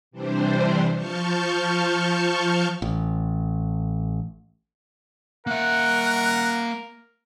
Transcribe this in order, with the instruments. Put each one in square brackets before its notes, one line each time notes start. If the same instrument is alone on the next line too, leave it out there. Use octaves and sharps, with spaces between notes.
[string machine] C3 E3 G3 D4 C5
F3 A5 C#6 F6 G6
[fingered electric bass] A1
[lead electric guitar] A#3 E5 [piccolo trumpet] A#4 [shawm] F#5